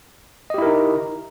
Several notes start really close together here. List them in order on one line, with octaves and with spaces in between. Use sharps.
D#5 G4 E4 A#4 D#4